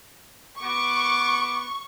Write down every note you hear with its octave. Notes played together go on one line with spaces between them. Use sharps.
B3 F#4 C#6 D6